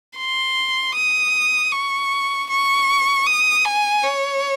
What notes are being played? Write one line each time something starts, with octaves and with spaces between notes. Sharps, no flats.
C6
D#6
C#6
C#6
D#6
G#5
C#5